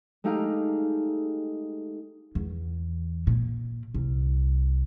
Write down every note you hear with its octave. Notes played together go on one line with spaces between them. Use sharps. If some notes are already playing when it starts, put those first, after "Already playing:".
G#3 A3 D#4 G4 G#4 F5
E2
A#2
C2